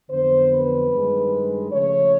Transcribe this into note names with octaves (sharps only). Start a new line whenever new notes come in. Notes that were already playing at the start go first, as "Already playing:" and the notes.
F2 D3 F#3 B3 C5
B4
G2 D#3 G#3
C#3 F3 A3 C#5